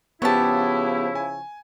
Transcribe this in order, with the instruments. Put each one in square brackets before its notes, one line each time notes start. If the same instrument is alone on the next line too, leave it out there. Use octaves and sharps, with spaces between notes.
[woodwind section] C#3 F3 E4 [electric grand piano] B3 G4 [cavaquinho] C#5 A5
[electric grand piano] G#5